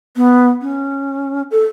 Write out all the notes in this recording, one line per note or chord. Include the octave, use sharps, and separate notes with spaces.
B3
C#4
A4